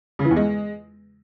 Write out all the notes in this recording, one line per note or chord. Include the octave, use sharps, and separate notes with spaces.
C#3
E3
E2
G#3